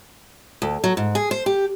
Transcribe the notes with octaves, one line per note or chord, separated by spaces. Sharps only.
D2
F#3
G#2
G#4
C5
G4